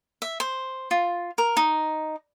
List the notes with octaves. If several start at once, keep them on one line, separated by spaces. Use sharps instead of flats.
E5
C5
F4
A#4
D#4